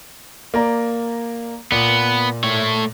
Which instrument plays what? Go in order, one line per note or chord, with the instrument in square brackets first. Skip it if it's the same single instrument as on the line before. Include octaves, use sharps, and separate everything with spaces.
[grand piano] A#3 D5 A#5
[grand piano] A#2 [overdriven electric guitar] B3
[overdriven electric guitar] A3 C#5